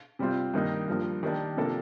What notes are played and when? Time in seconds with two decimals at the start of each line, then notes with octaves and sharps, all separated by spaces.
0.19 C3 G3 C4 F4
0.54 G2 D#3 A#3 D#4
0.88 G2 F3 A#3
1.23 D#3 G3 A#3 D4
1.57 C3 F3 A#3 D4 A4